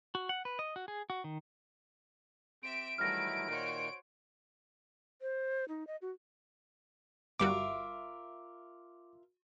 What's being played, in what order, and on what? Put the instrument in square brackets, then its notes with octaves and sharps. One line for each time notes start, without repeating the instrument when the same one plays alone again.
[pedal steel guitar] F#4
F#5
B4
D#5
F#4
G#4
F#4
D#3
[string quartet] C4 G4 E5 [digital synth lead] D7
[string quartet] D#3 G3 A3 [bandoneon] E3 F#3 E4 [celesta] F6 A#6
[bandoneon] A#2 D#3 [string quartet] F#4 C5 C#5
[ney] C5
D#4
D#5
F#4
[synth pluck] G1 G3 F#4 [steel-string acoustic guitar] F4 A#4 E5 [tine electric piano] D6